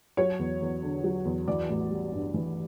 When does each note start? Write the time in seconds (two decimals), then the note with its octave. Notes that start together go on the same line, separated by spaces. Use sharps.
0.17 F#3 C#5
0.39 E2
0.62 E2
0.82 D3
1.04 F#3
1.25 E2
1.48 E3 D5
1.69 A1
1.91 G3
2.12 G2
2.34 E3